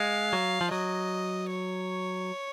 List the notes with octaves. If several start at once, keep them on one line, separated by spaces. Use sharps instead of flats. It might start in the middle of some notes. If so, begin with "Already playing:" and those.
Already playing: G#3 F5
F#3
F3
F#3 D#5
C#5